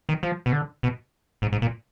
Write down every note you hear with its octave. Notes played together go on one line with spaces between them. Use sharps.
D#3
F3
B2
D3
B2
G#2
G#2
A#2